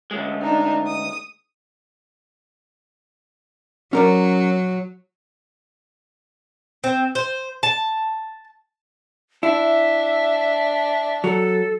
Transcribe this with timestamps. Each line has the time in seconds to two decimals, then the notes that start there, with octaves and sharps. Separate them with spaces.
0.11 D2 G#3
0.42 D4 D#4
0.87 D#6
3.93 F#3 C#4 A#4 D5
6.84 C4
7.15 C5
7.63 A5
9.43 D4 E4 E5
11.24 F#3 A4